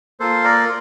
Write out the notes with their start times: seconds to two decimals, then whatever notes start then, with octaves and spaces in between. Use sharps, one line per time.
0.20 A#3 F4 A4 C5
0.44 A#4 D5